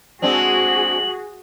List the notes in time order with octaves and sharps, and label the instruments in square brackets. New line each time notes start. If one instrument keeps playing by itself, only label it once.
[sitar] G#3 C4 D4 [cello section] F#4 G#4 [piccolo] F#7